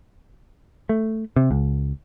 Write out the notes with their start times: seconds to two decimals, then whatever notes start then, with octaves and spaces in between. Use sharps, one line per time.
0.89 A3
1.36 C3
1.51 C#2